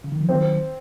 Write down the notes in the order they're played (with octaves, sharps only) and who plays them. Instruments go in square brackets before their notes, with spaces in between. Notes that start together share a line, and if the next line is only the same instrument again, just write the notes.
[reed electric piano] C#3
D#3
F3
[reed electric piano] D#3 F#3 [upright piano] C4